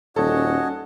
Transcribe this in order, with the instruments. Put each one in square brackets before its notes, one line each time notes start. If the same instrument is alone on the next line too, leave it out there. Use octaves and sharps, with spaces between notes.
[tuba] D#1 [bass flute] C#4 [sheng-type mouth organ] F#4 C#5 D#5 [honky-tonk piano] A4